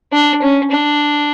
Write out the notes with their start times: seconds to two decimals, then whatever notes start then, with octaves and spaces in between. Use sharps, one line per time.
0.13 D4
0.42 C#4
0.71 D4